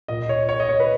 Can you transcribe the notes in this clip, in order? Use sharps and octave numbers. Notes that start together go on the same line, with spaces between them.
A#2 D#5
C#5
C#5
D#5
C#5
B4